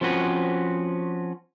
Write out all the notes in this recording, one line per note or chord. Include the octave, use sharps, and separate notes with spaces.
F3 C4 C#4 F#4 B4